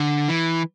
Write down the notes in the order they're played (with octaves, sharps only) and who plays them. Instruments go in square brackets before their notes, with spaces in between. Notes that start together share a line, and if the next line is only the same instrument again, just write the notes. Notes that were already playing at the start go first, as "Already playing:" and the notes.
Already playing: [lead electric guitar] D3
E3